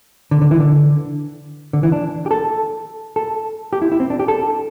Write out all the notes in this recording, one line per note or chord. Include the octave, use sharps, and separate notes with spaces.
D3
D3
E3
D3
D3
E3
D4
G4
A4
A4
G4
E4
E4
C4
D4
G4
A4